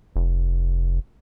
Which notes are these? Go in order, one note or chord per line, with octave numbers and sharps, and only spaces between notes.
F1